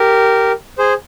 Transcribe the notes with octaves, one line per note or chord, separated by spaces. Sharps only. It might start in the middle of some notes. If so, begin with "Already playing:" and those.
Already playing: G4 A#4
G#4 C5